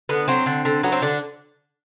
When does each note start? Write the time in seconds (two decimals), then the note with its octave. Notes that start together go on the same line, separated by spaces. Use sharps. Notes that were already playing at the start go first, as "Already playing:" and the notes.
0.09 D3 B3
0.28 F#3 C4
0.46 D3
0.65 D3
0.83 F#3 B3
0.92 C4
1.02 D3 D4